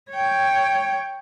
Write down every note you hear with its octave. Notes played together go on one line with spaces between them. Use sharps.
C#5 G5